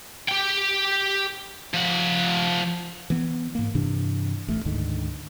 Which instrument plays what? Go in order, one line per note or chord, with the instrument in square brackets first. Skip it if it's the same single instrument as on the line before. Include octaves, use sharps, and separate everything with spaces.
[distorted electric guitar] G4 G5
F3 F#5
[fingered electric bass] E3 B3
G#2 A#3
G2 C3 E3 D4
A1 A3
D2 G#2 D3 D#3